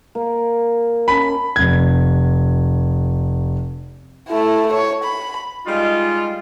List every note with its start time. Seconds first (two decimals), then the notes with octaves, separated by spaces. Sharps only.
0.15 A#3
1.08 C#4 A5 B5
1.56 F1 G#6
4.29 A3 E4
4.73 C#5
5.04 B5
5.66 G3 G#3 D#4 F4